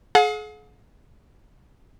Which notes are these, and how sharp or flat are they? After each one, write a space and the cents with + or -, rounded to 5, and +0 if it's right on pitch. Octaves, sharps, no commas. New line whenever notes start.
G#4 +40 F#5 -45